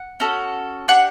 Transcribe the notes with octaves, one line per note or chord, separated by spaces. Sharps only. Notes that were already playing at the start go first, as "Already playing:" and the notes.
Already playing: F#5
C#4 F#4 A4
D4 G4 F#5